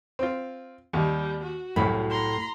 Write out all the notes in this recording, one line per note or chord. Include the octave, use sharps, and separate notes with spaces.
C4 F4
D#2 G3
F#4
C2 F#2 A2 B5
A#5 C6